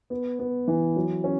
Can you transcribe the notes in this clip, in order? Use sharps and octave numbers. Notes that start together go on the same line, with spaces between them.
B3
B3
E3
F#3
C#4